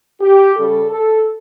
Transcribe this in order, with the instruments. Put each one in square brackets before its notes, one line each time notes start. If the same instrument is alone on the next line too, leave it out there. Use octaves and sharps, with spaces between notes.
[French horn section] G4
C#3 G3 A4
A4